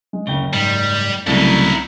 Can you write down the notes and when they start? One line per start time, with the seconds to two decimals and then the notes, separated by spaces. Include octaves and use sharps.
0.13 G#3
0.27 F#1 D2 C#3 G5 G7
0.53 G#2 G3
1.27 C2 C#3 F#3 A3 D#4 E4